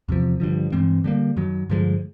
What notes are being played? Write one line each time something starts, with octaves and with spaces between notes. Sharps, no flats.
E2 C3 F3
G2 D3 F3
G2 E3 G#3 C4
D3 G3 A#3
F#2 D#3 F#3
G2 D3 F3 G#3